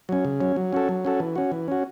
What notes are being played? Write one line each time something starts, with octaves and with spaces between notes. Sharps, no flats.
F#3 C#4
C#3
F#3 C#4
F#3
C#4 F#4 A4
F#3
C#4 F#4 A4
E3
C#4 F#4
E3
C#4 F#4